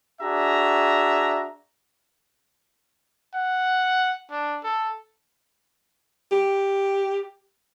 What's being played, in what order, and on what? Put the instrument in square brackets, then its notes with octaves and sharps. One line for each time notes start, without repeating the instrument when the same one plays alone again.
[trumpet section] D4 F#4 G#4 E5 A#5
[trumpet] F#5
D4
A4
[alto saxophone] G4